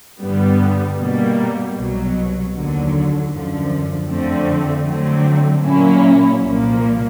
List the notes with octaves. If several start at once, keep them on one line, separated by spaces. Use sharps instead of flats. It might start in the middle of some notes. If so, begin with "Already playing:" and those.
G2 D3 G3 B3
B2 G3 A#3
C2 B2 F#3
D#2 D3 F#3
F#2 D3 F3
F2 D3 F3 A3 C4
D3 F#3 A3 C4
A#2 F#3 A#3 C#4 E4
C2 A#2 F3 A#3